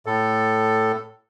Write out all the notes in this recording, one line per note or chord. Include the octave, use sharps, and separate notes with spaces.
A2 A4